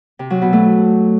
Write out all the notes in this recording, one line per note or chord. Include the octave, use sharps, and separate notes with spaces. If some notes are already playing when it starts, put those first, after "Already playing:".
C3
F#3
B2
A3